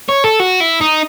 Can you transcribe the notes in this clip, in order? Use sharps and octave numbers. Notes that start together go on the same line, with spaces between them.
C#5
A4
F#4
E4
D#4